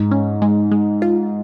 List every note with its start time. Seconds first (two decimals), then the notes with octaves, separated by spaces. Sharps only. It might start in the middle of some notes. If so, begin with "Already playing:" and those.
Already playing: G#2
0.11 C#4
0.42 G#3
0.71 G#3
1.02 F4